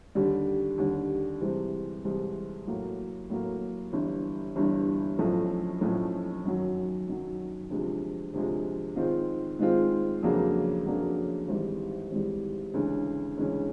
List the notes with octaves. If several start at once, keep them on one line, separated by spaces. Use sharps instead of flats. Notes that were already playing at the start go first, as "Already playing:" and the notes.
D#2 D3 G3
D#2 D3 G3
C2 C3 E3 G#3 C4
C2 C3 E3 G#3 C4
A2 F#3 A#3
A2 F#3 A#3
G1 G2 E3
G1 G2 E3
B1 A2 F3 A3 C#4
B1 A2 F3 A3 C#4
F#2 D#3 F#3
F#2 D#3 F#3
D2 C3 F3 G#3
D2 C3 F3 G#3
G#2 D#3 G#3 C4 F4
G#2 D#3 G#3 C4 F4
F2 C#3 F#3 A#3 D4
F2 C#3 F#3 A#3 D4
G#1 G#2 E3 G3
G#1 G#2 E3 G3
D2 C#3 E3 G#3 C#4
D2 C#3 E3 G#3 C#4